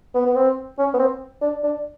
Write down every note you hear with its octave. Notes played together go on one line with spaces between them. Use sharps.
B3
B3
C4
C#4
B3
C4
D4
D4